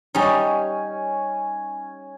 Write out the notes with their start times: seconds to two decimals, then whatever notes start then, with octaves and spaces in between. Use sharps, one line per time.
0.15 G3 C#4 D#4